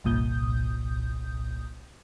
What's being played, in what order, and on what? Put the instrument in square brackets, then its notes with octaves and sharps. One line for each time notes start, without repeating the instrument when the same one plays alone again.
[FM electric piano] G1 C2 A#2 D#6 G6